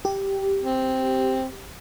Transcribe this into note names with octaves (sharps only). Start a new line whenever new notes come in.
G4
C4